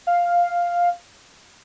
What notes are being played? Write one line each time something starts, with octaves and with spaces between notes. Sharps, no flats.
F5